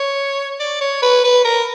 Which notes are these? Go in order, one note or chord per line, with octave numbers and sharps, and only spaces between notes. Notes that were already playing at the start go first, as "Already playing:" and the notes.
Already playing: C#5
D5
C#5
B4
B4
A#4